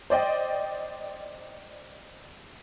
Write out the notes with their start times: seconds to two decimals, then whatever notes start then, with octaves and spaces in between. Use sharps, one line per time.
0.10 C5 D5 D#5 G5